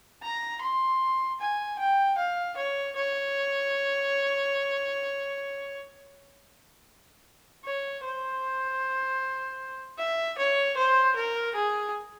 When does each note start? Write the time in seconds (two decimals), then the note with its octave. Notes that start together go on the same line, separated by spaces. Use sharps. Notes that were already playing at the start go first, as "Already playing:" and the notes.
0.23 A#5
0.61 C6
1.40 G#5
1.79 G5
2.18 F5
2.57 C#5
2.95 C#5
7.64 C#5
8.04 C5
9.98 E5
10.38 C#5
10.77 C5
11.16 A#4
11.55 G#4